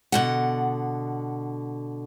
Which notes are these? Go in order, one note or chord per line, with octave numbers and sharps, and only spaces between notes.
B2 D3 F#5